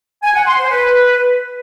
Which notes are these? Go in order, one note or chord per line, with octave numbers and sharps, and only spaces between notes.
G#5
F#5
C6
C5
B4